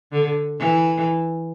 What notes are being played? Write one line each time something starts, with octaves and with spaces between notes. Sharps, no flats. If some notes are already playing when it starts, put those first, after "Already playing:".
D3
E3